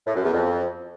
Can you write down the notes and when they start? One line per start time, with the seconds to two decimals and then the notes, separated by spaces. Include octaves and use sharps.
0.06 A2
0.15 F#2
0.23 E2
0.32 F2